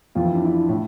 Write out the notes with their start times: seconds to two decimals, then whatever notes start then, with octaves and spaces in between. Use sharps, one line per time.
0.15 F2 E3 F4
0.25 E4
0.35 D4
0.45 E4
0.69 A2